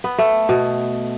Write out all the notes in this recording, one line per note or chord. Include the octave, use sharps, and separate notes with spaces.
B3
A3
B2